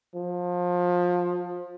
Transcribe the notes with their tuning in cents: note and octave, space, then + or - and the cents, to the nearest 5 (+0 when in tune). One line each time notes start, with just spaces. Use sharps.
F3 +25